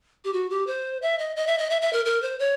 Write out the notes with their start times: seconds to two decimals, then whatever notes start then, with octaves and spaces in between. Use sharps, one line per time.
0.25 G4
0.33 F#4
0.50 G4
0.67 C5
1.02 E5
1.19 D#5
1.36 D#5
1.47 E5
1.58 D#5
1.70 E5
1.82 E5
1.93 A#4
2.05 A#4
2.22 C5
2.39 C#5